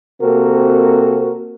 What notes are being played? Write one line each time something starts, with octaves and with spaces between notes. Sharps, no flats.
C3 A#3 C4 F#4 A4 A#4